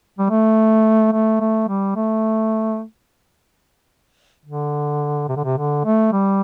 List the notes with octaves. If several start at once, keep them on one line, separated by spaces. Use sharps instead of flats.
G3
A3
A3
A3
G3
A3
D3
C3
D3
C3
D3
A3
G3